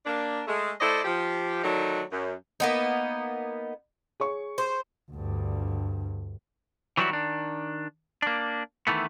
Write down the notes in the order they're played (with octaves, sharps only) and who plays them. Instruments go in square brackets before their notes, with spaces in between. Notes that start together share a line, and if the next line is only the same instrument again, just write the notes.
[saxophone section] A#3 D4
G#3 A3
A3 E4 A4 C5 D5 D#5
F3 G4
D3 D#3 F#3 A3 D4 D#4
F#2
[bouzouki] A#3 B3 D#4
[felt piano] G#4 C#5 C#6
[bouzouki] C5
[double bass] D2 G2
[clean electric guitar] E3 F#3 G3 D4 E4 F#4
D#3 D4
A#3 D4
D#3 E3 A3 B3